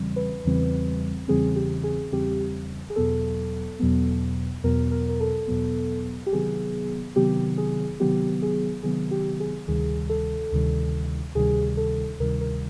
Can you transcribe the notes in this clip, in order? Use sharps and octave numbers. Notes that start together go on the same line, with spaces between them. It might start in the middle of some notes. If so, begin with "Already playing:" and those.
Already playing: E2 C#3 E3 G3 C4
B4
E2 C#3 E3 G3 C4
E2 C#3 E3 G3 C4 G#4
G4
G#4
E2 C#3 E3 G3 C4 G4
G#4
E2 B2 F#3 B3 A4
E2 B2 F#3 B3
E2 B2 F#3 B3 A#4
A#4
A#4
A4
E2 B2 F#3 B3
G4
C3 D#3 F#3 B3 G#4
C3 D#3 F#3 B3 G4
G#4
C3 D#3 F#3 B3 G4
G#4
C3 D#3 F#3 B3 G#4
G4
G#4
D2 C3 D#3 G3 G#4
A4
D2 C3 D#3 G3
D2 C3 D#3 G3 G#4
A4
D2 C3 D#3 G3 A#4
A#4